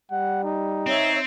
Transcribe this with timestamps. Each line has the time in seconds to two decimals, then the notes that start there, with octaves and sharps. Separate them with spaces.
0.11 G3 F#5
0.44 D#4
0.86 C4 C#5 E5